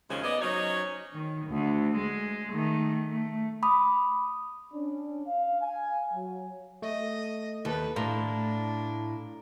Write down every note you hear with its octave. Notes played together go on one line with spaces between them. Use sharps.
D#2 C#3 F3 G#3 C#4
B3 D5 D#5
F#3 C#4 D#4 C5 C#5
D#3
D2
G#3
D#3 A3
A3
B5 D6 D#6
C#4 D4
F5
F5 G#5
F#3
A3 D#5
D#2 A4 B4
A2 D4 F5 A#5 C6